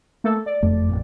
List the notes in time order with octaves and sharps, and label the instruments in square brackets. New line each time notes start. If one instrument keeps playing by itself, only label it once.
[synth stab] A3 A#3 A4
D5
[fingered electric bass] F#1 F2 A3
A1 F2 A#2